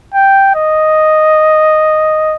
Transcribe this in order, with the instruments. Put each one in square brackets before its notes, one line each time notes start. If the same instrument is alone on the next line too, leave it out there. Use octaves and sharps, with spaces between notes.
[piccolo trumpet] G5
D#5